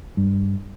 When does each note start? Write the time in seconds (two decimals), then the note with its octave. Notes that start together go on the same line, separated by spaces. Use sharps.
0.17 G2